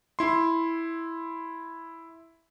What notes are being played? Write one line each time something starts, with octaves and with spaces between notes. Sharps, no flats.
E4 C6